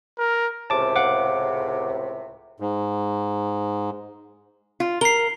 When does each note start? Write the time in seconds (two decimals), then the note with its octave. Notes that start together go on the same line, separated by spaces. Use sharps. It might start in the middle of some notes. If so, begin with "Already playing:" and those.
0.19 A#4
0.70 C#2 A2 C3 A5 D6
0.96 F5 F#5 D6
2.60 G#2
4.80 F4
5.01 A#4 C7 G7